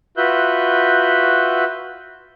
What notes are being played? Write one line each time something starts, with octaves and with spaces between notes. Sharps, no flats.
F4 F#4 B4 E5 F#6 G6